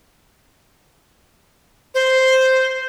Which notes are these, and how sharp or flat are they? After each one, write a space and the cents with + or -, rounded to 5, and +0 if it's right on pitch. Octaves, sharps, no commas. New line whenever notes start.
C5 -5